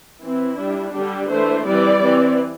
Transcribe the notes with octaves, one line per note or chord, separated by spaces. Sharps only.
E3 C4 E4
G3 D4
D3 G3 D4 G4
E3 A3 D4 C5
E3 G3 C4 D5
E3 C4